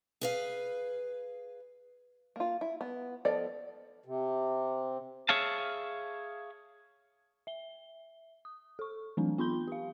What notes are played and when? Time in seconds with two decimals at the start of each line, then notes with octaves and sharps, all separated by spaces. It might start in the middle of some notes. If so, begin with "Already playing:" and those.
0.21 G#4 B4 F5
2.36 A#3 F4
2.61 E4
2.81 B3
3.25 F3 B3 A4 D5 D#5
4.06 C3
5.29 G#4 C#5 E5 F5 A5
7.47 E5 G7
8.45 D#6
8.79 A4 C#6
9.17 E3 F#3 A3 C4 D4
9.38 B3 F4 B5 C6 G6 G7
9.68 G4 F5